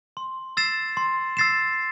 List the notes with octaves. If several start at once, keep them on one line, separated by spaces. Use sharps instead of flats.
C6
E6 A6 C7 E7
C6
E6 A6 C7 E7